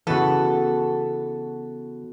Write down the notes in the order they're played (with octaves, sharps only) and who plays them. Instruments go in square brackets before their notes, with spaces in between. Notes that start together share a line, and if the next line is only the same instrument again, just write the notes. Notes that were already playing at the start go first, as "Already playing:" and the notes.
[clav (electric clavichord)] C#3 E3 [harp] B3 F#4 [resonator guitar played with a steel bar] A4